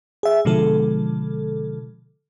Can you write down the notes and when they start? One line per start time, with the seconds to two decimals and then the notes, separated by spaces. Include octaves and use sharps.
0.23 G#4 E5
0.45 B2 D3 F3 G#3 A4